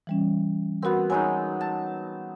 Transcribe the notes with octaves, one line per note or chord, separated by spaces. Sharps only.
E3 G3 C#4
B3 C4 F#4 A#4
F#3 G#3 D#4 G#5 E6
A5